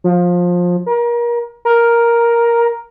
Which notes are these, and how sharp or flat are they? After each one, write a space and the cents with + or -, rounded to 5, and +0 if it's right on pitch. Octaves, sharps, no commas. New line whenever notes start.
F3 +20
A#4 +30
A#4 +5